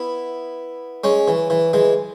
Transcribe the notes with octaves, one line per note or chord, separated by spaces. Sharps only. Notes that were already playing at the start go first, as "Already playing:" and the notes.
Already playing: B3 E4
G#3 C#4
E3
E3
E3 G#3